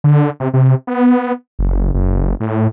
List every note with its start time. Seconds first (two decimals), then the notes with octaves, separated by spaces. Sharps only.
0.04 D3
0.40 C3
0.54 C3
0.87 B3
1.59 F#1
1.94 F#1
2.40 A2